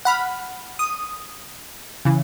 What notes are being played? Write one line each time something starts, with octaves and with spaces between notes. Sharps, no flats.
F#5 B5 F6
D#6
C#3 E3